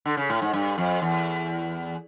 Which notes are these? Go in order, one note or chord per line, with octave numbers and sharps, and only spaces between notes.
D3
C#3
A2
G#2
G2
F2
E2